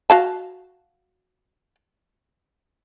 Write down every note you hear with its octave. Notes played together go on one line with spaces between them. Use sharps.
F#4 F5 A5